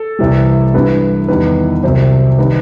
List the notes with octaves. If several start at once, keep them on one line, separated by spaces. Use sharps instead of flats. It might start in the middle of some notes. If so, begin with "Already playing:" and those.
Already playing: A4
C2 C3 E3 G3
G2 E3 G3 B4
E2 D#3 G3 B4
C2 C3 F#3 C5
D#3 G3 B4